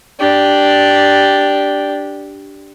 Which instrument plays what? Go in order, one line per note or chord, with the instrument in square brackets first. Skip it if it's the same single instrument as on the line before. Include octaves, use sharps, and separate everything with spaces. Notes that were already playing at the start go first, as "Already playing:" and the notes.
[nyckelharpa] D4 G4